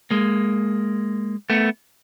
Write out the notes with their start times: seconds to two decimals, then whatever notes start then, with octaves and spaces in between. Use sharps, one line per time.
0.11 G#3 A#3
1.50 A3 B3